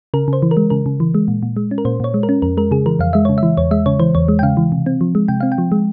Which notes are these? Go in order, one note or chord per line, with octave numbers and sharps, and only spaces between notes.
C#3 A#4
C#3 C5
E3
A#4
G#3
C#3 A#4
C#3
E3
G#3
A#2
A#2
G#3
C#4
A#4
A#2 C5
A#2 C#5
G#3
A#4
C#4
F2 A#4
G#3 A#4
C#3 G#4
E3 A#4
F2 F5
G#3 E5
C#3 C#5
E5
E3
E2 C#5
G#3 E5
C#3 C#5
E3 C5
E2 C#5
G#3
G5
C#3 F5
E3
C3
C4
F3
G#3
C3 G5
C4 F5
G5
F3
G#3